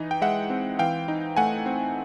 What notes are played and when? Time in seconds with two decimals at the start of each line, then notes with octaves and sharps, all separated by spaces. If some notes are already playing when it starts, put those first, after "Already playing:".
Already playing: E3 D#4
0.11 G5
0.22 G#3 E5 F#5
0.50 C4
0.79 E3 F5 G5
1.08 D#4
1.37 A3 F#5 G#5
1.66 C4